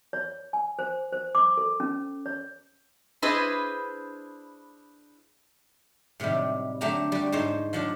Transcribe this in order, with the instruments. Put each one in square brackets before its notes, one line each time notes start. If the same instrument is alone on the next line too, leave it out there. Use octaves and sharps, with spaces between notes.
[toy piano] C#5
G#5
C5
C5
D6
A4
C#4
C#5
[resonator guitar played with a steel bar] D4 E4 G#4 B4 C5 D#5
[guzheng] A2 C3 D#3 F#3 G3
D3 F#3 A3 G4 A#5
G3 F#4
G#2 F3 D#4 C5 C#5
F3 F#3 D4